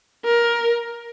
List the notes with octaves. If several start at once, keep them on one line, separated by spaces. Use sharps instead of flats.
A#4